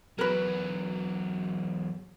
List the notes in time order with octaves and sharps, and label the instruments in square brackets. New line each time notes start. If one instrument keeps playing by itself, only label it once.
[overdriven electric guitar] E2 F#3 [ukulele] A#4 B4